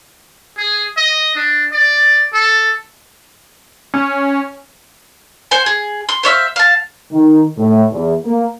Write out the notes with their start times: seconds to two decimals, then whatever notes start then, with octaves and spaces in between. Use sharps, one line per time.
0.58 G#4
0.97 D#5
1.35 D4
1.72 D5
2.33 A4
3.94 C#4
5.51 C5 F#5 G#5
5.66 G#4
6.09 C6
6.23 C5 C#5 E5 F5
6.56 F5 A5
7.11 D#3
7.57 A2
7.91 E2
8.24 A#3